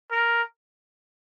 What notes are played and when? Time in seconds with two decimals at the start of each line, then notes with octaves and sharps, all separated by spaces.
0.12 A#4